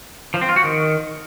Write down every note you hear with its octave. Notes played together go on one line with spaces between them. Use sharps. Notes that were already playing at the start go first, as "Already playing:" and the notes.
F3
C4
F4
F#4
D#3